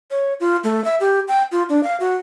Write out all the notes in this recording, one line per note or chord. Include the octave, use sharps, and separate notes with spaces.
C#5
F4
A3
E5
G4
G5
F4
D4
F5
F#4